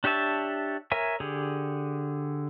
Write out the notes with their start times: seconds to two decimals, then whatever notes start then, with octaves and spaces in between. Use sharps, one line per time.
0.04 D4 G4 C#5 E5 A5
0.92 A#4 C#5 E5 G#5
1.20 D3 G4 G#4